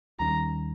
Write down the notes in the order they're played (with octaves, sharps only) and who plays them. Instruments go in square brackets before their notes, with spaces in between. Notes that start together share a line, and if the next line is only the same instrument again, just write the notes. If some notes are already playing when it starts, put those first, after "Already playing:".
[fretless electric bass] D#2 D#3 G3 C#4 [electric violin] A#5